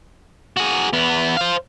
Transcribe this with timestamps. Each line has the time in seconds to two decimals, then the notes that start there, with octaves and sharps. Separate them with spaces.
0.57 F#4 G#4
0.93 E2 B3
1.37 C5 F5